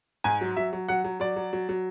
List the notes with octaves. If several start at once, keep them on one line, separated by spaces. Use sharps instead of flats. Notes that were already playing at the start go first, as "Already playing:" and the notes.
G#2 G#5
F#3
F#3 E5
F#3
F#3 F#5
F#3
F#3 D5
F#3
F#3
F#3